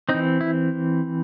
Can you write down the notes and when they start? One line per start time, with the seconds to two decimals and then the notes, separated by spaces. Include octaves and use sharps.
0.09 C4 D#4
0.14 E3
0.41 E4